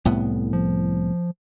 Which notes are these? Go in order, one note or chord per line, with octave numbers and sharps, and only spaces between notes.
C2 A2 B3
F3